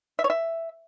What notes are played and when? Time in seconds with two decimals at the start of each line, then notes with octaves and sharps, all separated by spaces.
0.19 E5
0.24 C#5
0.30 E5